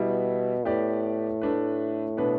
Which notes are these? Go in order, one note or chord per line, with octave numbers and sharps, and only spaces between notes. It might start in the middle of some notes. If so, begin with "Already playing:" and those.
Already playing: B2 G3 B3 E4
A2 B3 G4 B4 D5
A3 D4 B4
B2 B3 D4 B4